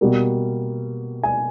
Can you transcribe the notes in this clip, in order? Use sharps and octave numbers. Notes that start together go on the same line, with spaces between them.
B2 G3 A#3
G#5